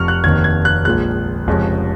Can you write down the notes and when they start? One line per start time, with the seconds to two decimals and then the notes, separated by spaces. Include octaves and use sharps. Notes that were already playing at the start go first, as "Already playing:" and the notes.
Already playing: F1 F2 C#6 F6
0.08 F#6
0.24 F1 D#2 D#3 G#6
0.44 G#6
0.65 F#6
0.85 A#1 A#2 G#3 F#6
1.47 F1 F2 C#3 G#3 C#4